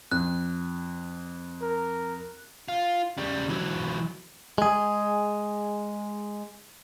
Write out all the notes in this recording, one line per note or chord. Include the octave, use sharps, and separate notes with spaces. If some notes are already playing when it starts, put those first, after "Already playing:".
F2 F#6
A#4
F4
C#3 G3
E3 F#3
G#3 G#4